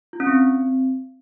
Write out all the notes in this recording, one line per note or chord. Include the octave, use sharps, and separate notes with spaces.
F4
C#4
C4